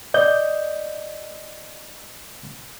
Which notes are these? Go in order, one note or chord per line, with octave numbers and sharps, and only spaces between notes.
D5 D#5 G6